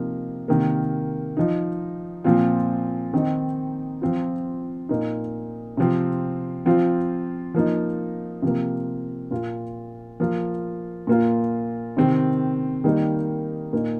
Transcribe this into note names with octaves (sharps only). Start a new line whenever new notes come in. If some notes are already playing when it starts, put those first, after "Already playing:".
Already playing: C3 F3 A#3 D#4
C3 D#3 A#3
F3 D#4
A#2 F3 C4 F4
D#3 C4 D#4
F3 C4 F4
A#2 A#3 D#4
C3 F3 C4
F3 C4 F4
F3 A#3 D#4
C3 F3 A#3
A#2 A#3 F4
F3 A#3 F4
A#2 A#3 F4
C3 D#3 C4
D#3 G3 A#3 D#4
A#2 A#3 D#4